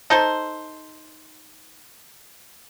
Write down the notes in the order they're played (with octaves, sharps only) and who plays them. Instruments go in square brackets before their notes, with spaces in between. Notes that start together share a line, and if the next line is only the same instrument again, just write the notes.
[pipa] D#4 A4 C5